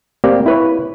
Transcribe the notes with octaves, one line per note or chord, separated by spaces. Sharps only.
A#3 C4 G4 D5 G5
E4 B4 C#5